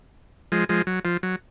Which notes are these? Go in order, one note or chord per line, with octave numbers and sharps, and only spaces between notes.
F3 G#3
F3 G#3
F#3
F3
F#3